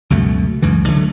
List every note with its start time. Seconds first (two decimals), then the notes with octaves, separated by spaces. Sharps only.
0.10 C#2 F#2 B2 A3
0.62 C#2 F#2 E3
0.88 D3 F#3 A3